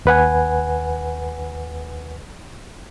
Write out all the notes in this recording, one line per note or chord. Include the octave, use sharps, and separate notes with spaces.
D#2 B4 F#5 G#5